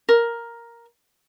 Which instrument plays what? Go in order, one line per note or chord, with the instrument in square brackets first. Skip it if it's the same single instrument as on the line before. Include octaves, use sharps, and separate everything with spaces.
[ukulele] A#4